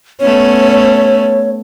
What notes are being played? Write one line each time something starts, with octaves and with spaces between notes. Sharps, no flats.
A3 B3 C#4 C#5